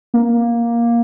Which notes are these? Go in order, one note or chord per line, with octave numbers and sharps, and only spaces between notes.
A#3